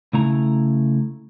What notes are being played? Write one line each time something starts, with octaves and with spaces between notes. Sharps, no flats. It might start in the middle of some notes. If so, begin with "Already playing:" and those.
C#3 A3 E4 A#5